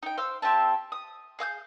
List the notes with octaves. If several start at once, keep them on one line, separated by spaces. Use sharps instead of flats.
D#4 G5
C5 F5 E6
C4 G4 E5 A5
D#6
G#4 F5 D#6 G6